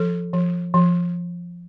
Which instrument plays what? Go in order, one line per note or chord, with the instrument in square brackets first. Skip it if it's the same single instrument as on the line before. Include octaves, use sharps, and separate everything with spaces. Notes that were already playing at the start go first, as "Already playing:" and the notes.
Already playing: [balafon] F3 A4
F3
F3